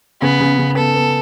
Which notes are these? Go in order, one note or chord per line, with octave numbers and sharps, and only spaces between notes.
C#3 B3
C#3
C#3
B3 A4
B3